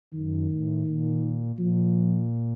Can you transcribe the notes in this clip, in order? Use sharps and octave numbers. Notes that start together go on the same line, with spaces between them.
F#2 D#3
A2
A#2
A#2 F3